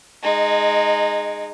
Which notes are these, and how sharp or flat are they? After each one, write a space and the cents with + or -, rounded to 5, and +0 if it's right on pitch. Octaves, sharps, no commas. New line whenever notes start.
G#3 +0 D#4 -20